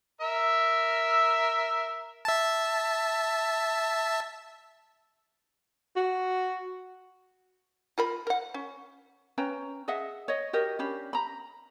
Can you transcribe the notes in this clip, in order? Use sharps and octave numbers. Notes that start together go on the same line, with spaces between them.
A#4 E5 E6
E5 A5
F#4
F4 A#4 B5
A#4 F#5
C#4
C#4 B4 G5 A#5
G#4 D#5 E5 F#5
C#5 D#5
F#4 G4 A#4 D#5
C#4 D4 G4 B5
A#5 B5